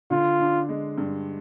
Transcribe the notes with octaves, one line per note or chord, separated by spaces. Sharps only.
D3 F4
D4
G#3
G2